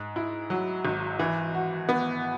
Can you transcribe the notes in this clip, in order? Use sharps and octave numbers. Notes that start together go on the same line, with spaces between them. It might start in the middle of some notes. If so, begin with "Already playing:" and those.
Already playing: G#2
E4
F#3
G#1
E3
F#4
B3